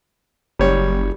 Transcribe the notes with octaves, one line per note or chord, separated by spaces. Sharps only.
F#1 G3 C#5